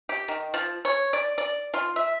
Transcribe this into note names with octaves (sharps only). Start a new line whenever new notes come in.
G4
D#3
F3
C#5
D5
D5
F4
E5